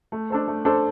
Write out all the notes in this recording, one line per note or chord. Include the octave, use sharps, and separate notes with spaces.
A3
D4 A4 C5
A3
D4 A4 C5